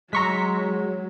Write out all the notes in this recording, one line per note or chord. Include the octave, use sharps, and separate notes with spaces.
F#3 G#3 A#5 C6 C#6 E6 B6